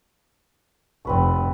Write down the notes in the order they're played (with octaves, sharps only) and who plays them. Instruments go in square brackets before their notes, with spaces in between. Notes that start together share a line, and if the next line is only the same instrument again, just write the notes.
[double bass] F1 [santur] C4 B4 C#6